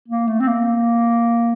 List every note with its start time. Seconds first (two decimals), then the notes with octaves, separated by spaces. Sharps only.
0.08 A#3
0.28 A3
0.40 C4
0.47 A#3